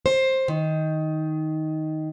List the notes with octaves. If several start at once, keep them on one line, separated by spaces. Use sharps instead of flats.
C5
D#3